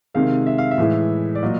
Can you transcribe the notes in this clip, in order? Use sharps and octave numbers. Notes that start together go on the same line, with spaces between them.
C3 D#3 G#3 F5
E5
F5
E5
A2 E3 G#3
D5
A#2 F#3 D#5